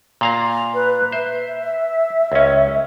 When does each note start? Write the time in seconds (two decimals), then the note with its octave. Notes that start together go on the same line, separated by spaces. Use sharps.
0.21 A#2 F5 A#5
0.74 B4
1.12 C5 E5
2.32 C#2 C#4